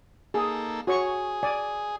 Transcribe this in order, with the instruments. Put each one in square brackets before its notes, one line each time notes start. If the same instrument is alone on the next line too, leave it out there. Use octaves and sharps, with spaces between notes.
[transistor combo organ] A#3 D#4 A4 [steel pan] G#4
[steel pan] F#4 C#5 C#6 [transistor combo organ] G#4
[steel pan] D5 G#5